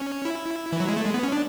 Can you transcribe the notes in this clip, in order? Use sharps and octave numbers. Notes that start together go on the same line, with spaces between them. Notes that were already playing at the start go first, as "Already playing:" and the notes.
Already playing: C#4
E4
E3
F#3
G#3
A3
G#3
B3
C#4
D4